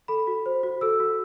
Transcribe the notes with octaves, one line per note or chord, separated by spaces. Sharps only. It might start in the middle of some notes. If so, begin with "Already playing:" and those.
A4 B5
F#4
C5
F#4
A4 E6
F#4